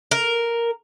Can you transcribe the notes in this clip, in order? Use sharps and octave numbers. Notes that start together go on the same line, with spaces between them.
A#4